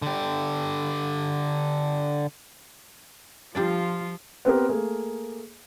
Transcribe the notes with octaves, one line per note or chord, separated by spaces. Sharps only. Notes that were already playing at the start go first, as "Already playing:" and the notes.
D3 G4
F3 G3 D4 F4 D5
B3 C4 G4 A#4
A3 A#3 G#4